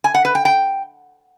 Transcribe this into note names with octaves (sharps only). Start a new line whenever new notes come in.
G#5
F#5
B4
G5
G5